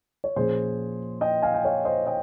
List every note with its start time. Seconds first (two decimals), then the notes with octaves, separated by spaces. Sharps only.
0.24 C#5
0.36 A#2 F3 A#3 C#4 G#4 C5
1.21 D#5 G5
1.43 F5 G#5
1.54 G5
1.65 C#5 F5
1.85 C5 D#5
2.06 D#5 G5